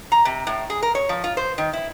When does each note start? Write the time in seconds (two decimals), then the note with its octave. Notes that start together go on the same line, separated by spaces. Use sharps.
0.12 A#5
0.25 C3
0.47 A2
0.70 G#4
0.82 A#4
0.95 C#5
1.09 F3
1.24 F4
1.37 C5
1.58 D#3
1.73 E4